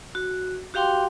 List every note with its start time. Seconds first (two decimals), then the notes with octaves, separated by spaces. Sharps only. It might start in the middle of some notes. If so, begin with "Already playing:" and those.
0.15 F#4
0.74 F#4 G4 F5 G5 C6 D6